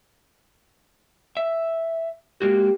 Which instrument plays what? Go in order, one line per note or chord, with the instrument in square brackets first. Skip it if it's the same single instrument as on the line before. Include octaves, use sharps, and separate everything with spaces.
[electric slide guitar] E5
[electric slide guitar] G#3 A#3 F#4 [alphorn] G4